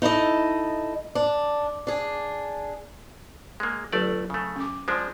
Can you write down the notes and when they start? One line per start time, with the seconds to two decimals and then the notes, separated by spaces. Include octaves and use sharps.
0.02 D#4 E4 A4 D#5
1.15 D4
1.87 D4 G#4
3.60 G#3 A#3
3.93 G1 F#3 A3 D5
4.30 C#3 A3
4.56 C#4 D6
4.88 F3 G#3 D4 C5